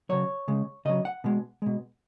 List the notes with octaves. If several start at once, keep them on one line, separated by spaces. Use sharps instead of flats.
C#3 F#3 C#5
C#3 G#3
C#3 F#3 D#5
F#5
B2 G#3
B2 G#3